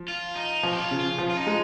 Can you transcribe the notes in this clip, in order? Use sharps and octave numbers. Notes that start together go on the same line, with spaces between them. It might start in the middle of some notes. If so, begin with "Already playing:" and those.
Already playing: F3
F4
D#4
F3 C#4
G4
F4
C#3
F4
F3
F4
D#4
G#3